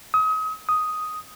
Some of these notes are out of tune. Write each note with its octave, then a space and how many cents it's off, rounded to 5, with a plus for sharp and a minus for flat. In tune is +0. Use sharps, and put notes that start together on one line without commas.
D#6 +35
D#6 +5